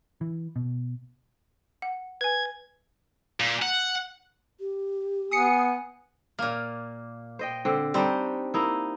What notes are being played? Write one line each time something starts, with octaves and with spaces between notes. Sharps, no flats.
E3
B2
F#5
B4 G#5 G#6
A#2
F#5
G4
B3 G#5 D#6 C7 C#7
A#2 A#3
C5 D#5 G5
D3 C4
G3 C4 D4 D#4
A#3 D#4 E4